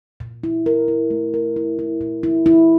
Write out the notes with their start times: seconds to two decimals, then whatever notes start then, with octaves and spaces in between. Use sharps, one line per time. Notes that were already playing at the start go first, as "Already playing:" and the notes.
0.20 A#2
0.44 E4
0.66 A#4
0.88 E4
1.10 A3
1.34 A#4
1.56 E4
1.79 E4
2.01 A#2
2.23 E4
2.46 E4